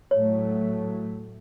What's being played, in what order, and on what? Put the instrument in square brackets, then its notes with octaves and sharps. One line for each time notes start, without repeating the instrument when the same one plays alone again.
[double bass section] A2 F#3 A3 [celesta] C#5